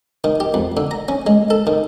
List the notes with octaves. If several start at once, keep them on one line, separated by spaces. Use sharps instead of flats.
D#3
G4
F2
D3
A#5
C#4
G#3
A4
D#3